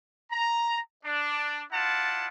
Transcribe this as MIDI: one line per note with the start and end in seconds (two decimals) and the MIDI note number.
0.31 0.79 82
1.05 1.62 62
1.72 2.28 64
1.72 2.28 65
1.72 2.28 74
1.72 2.28 78
1.72 2.28 81